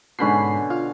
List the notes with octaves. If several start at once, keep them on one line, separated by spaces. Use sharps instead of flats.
G#2 B2 D3 C#4 B5 C7
F4 F5